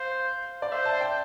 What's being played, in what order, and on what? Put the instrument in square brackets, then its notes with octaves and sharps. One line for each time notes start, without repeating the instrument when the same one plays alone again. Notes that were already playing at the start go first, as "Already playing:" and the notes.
Already playing: [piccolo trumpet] C5 [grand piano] F5
[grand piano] D5
[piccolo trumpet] C5 [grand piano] E5
[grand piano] A5
G5